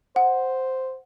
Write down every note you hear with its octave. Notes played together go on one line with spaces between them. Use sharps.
C5 F#5